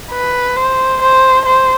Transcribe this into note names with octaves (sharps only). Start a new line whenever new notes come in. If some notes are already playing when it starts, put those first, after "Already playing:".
B4
C5
C5
C5